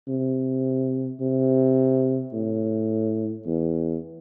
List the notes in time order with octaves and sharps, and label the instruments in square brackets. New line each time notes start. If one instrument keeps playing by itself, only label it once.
[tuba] C3
C3
A2
E2